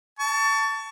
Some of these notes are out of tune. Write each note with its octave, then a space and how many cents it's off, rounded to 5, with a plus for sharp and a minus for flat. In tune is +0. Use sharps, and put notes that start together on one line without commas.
A5 +10 C#6 +30